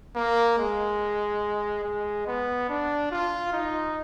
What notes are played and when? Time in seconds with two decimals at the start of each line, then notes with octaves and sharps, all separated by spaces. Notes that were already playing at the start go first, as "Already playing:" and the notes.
0.16 A#3
0.58 G#3
1.84 G#3
2.27 B3
2.69 D4
3.11 F4
3.53 D#4